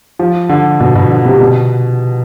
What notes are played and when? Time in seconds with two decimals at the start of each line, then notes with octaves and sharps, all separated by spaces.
0.19 F3
0.49 D3
0.80 B2
0.95 B2
1.10 D3
1.25 C3
1.40 B2